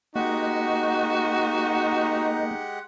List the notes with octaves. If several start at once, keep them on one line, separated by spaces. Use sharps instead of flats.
G#3 A#3 D#4 F#4 G4 D#5 F#5